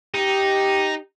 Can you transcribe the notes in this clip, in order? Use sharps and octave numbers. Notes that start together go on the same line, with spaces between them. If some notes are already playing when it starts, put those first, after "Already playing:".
D#4 G4